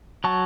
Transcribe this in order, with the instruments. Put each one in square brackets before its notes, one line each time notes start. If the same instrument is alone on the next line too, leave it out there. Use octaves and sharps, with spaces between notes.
[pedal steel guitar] F#3 A5 C#6